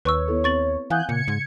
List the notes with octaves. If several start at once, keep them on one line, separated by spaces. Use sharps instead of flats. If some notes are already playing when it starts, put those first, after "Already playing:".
D#2 B4 C#5 C#6 E6
B3 E4 A4
C4 C#6 A6 F#7
E3 F5 F#5 G#5 D#6 F#6 G6
A#2 C#3 G#6 C#7
G#2